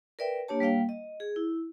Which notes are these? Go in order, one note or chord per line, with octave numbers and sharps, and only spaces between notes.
A#4 B4 D5 E5 G5
A#3 D4 G4 C#5 A5
G3 A#3 F5 G5
D#5
G#4
E4